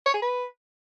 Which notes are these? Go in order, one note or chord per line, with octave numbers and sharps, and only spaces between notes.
C#5
G#4
B4